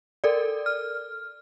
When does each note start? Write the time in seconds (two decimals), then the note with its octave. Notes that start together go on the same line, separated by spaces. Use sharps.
0.24 A4 A#4 D5
0.66 F6